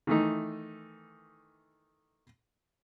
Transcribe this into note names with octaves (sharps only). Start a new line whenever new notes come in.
D#3 E3 A3 D#4